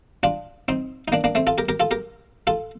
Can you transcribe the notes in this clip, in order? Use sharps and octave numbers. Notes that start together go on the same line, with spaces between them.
D4 F4
C4 D#4
D#4
A#3 D4
A#3 D4
A3 C4
F4 A4
G4 A#4
G4 A#4
F4 A4
G4 A#4
F4 A4